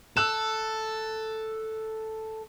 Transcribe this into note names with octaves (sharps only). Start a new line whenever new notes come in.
A4 E6 F#6 E7